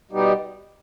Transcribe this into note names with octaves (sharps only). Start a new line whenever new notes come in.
B2 G3 B3 D#4 G4